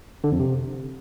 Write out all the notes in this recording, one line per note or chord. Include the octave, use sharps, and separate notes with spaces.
D3
F2
C3